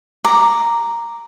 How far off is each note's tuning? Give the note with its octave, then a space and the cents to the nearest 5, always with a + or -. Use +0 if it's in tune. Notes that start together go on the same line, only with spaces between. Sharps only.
A#5 +0 D6 +0